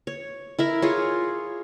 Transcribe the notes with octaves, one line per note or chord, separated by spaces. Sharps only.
C#5
E4 A#4 E5
F4 G#4 C#5